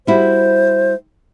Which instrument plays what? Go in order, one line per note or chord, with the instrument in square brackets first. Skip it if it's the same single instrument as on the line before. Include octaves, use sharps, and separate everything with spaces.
[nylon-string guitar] G3 E4 F#4 [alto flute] C5